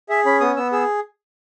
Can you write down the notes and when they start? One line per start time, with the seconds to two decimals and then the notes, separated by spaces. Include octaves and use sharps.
0.09 G#4 E5
0.25 C#4 B5
0.41 B3 D#6
0.56 B3 E6
0.72 G#4 E6